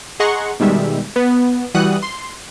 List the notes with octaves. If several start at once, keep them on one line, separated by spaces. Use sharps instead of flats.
G#4 D#5 F#5 A#5 C6 C#6
B2 D#3 G3 G#3 E5
B3
E3 G3 F#4 F#5 D#6 F#6
C6